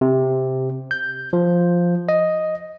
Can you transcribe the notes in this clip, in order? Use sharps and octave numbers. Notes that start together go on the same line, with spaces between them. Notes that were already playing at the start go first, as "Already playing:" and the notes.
C3
G6
F3
D#5